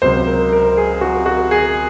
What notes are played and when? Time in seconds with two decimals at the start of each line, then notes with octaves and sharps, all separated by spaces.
0.02 C#2 C3 F#3 C5
0.27 A#4
0.52 A#4
0.77 G#4
1.01 F#4
1.26 F#4
1.51 G#4